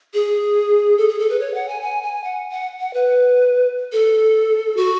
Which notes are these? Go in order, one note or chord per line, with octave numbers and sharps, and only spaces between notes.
G#4
A4
G#4
A4
B4
C#5
F#5
G#5
G#5
G#5
F#5
F#5
F#5
B4
A4
F#4